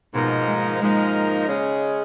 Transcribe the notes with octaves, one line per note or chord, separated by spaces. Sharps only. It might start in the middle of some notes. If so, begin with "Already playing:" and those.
G#2 B2 F3 A#3 D#4 A#4
G#3
G#2 F3 G#3 A#3 D#4 A#4
C#3 G#3 C#4 G#4